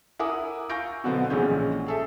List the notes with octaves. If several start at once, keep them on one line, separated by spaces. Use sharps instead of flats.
E4 A#4 F#5 G#5 D6 D#6
F5 G#5 C#6 G6 A#6 D7
B2 D3 F#3 B3 C4
A#1 C#3 E3 G#3 C#4 G6
G#4 A4 E5